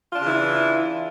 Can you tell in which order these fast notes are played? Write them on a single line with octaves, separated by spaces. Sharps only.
F4 D4 C#3 E3 E4